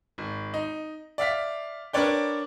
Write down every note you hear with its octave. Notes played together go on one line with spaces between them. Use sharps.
G#1
D#4
D5 E5 F5 B6
D4 A#4 B4 C#5 D5 G5